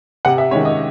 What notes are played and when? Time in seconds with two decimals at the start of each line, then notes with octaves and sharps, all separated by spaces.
0.25 C3 F#5
0.38 E5
0.51 D#3 G#3 C#4 C#5
0.65 D#5